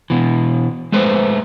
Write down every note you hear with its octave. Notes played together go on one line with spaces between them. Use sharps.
B2 E3
G#3 A3 B4 C5